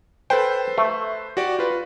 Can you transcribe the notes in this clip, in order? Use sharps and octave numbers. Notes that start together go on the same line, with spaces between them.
A4 B4 C5 G5
A3
F#4 G4 D5
F4 B4